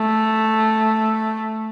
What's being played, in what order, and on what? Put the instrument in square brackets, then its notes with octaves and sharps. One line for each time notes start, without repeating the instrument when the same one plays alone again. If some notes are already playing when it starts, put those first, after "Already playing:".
Already playing: [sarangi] A3